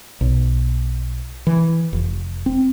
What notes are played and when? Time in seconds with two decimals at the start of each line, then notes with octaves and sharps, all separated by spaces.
0.21 B1
1.47 E3
1.93 F1
2.46 C4